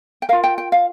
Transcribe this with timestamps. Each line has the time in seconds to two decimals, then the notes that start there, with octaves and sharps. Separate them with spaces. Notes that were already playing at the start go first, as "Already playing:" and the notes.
0.22 G5
0.29 F4 A#4 F5
0.44 G5
0.58 G5
0.72 F5